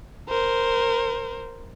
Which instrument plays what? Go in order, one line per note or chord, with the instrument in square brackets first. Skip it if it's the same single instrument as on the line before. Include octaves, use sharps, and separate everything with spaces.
[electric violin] A#4 C5